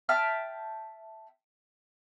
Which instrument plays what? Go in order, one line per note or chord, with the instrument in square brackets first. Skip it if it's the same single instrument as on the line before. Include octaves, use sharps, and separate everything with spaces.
[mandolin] E5 G5 A5 F6